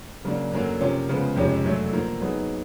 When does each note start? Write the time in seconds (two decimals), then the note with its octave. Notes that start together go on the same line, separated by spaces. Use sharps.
0.25 C#3 F#3 A#3 D4
0.52 F#2 D3 F#3 A#3
0.81 C3 F3 A#3 C#4 F4
1.09 C#3 F3 G#3 B3
1.36 F2 C3 F3 G#3 C#4
1.64 F#2 D3 F#3 A3
1.93 D3 F3 A#3
2.22 F#3 B3 D#4 G#4